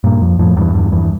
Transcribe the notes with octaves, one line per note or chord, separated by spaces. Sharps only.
G2 A#2
F2
F2 A2
E2 G2
E2 G2
E2 G2